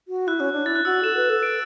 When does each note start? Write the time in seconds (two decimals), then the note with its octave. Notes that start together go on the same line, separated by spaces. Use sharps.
0.08 F#4
0.28 E4 F#6
0.40 C#4
0.53 D4
0.65 E4 A6
0.76 F#6
0.85 F#4 E6
0.94 F#6
1.04 A4 E7
1.17 B4
1.30 A4
1.43 D7